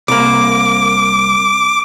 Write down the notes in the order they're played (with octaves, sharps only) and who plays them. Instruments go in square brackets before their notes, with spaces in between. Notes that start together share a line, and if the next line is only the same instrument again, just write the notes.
[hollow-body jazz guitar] C2 A#3 [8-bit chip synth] D6